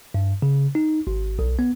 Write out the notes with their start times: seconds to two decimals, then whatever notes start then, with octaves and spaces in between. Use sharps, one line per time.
0.14 G2
0.42 C#3
0.75 D#4
1.07 G#1
1.39 B1
1.59 B3